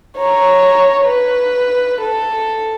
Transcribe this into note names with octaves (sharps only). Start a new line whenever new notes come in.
C#5 A#5
B4
A4